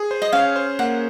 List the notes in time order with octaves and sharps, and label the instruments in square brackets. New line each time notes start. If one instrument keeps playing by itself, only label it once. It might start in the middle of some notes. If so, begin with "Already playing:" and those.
Already playing: [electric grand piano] G#4
C5
[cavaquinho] D#5
[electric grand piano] C#4 [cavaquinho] F5
[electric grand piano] C5
[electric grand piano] A#3 [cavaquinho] F#5